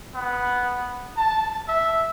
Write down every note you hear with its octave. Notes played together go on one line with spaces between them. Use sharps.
B3
A5
E5